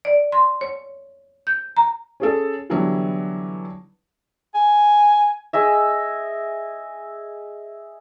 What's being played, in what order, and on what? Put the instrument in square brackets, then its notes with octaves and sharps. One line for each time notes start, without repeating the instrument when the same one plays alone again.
[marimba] D5
C6
C#5
G6
A#5
[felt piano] C#4 G#4 A4
D3 E3 F#3 G3 B3 E4
[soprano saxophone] G#5
[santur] G#4 D#5 E5